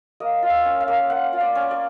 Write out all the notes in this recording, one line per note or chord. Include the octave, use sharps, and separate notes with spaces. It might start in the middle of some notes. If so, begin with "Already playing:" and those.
A#3 D#5
F4
E5
C#4
F5
A#3
A#3 F#5
F4
D5
C#4
D5